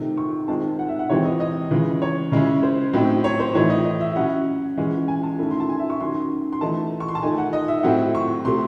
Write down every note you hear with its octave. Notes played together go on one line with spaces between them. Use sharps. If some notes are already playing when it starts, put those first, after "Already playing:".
Already playing: C3 D#3 A3 D#4
C#6
D#3 G#3 C4 A5
F#5
E5
F#5
C3 E3 G#3 C4 C#5
D#5
D#5
C#3 E3 G#3
C#5
C#3 G#3 C#4 E4
C5
A2 F#3 C4 D#4
C#5
C5
A2 E3 A3 D#4 C#5
D#5
D#5
E5
F#3 C#4 E4 F#5
E3 G#3 C#4
G#5
A5
D#3 A3 C#4 E4
C6
A5
G#5
E5
C#6
D#3 F#3 C#4 C6
C6
E3 A3 D#4 A5
C#6
C6
A5
D#3 A3 D#4 G#5
F#5
D#5
E5
A2 F#3 A3 C4 E4 F#5
C#6
C3 F#3 A3 C6